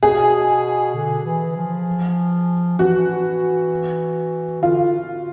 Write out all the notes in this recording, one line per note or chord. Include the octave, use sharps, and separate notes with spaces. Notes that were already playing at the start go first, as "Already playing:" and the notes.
B2 G#4
D3
E3
F3
E3 F#4
D3 F4